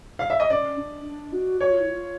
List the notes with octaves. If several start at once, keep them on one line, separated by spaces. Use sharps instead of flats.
F5
E5
D#5
C#4 D5
D4
D4
F#4
F#4 C#5
F4
E4
F4